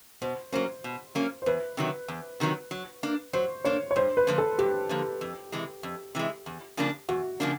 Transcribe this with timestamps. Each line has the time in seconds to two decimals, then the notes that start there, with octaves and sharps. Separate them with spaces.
0.22 B2 C5
0.52 F#3 A#3 C#4 C5
0.84 B2
1.15 F#3 A#3 C#4
1.42 C5
1.46 E2 B4
1.77 C3 D#3 F#3
2.08 E2
2.40 C3 D#3 F#3
2.71 F#3
3.03 A#3 D4
3.33 F#3 C5
3.65 A#3 D4 C#5
3.91 C#5
3.96 G2 C5
4.17 B4
4.27 D3 F3 A#3
4.38 A4
4.59 G2 G4
4.89 D3 F3 A#3
5.21 F2
5.52 C3 E3 G#3
5.83 F2
6.15 C3 E3 G#3
6.46 E2
6.77 C#3 F3 A#3 D4
7.09 E2 F#4
7.40 C#3 F3 A#3 D4